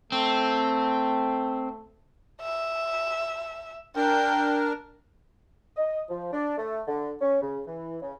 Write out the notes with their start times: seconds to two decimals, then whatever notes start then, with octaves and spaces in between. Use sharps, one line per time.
0.12 A3 C4
2.42 E5
3.96 D4 A#4 G5
5.77 D#5
6.09 F3
6.33 D4
6.58 A3
6.88 D3
7.21 C#4
7.41 C#3
7.66 E3
8.02 C#3